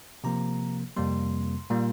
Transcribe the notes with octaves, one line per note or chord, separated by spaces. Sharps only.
C3 F3 A#3 A#5
F2 C3 G3 A#3 C6
A#2 G3 A#3